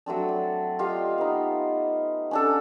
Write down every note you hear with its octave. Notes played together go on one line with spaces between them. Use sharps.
F#3 A3 C4 D4
D5
F4 G4 D#5 F5
B3 D#4
C#4 D4 A4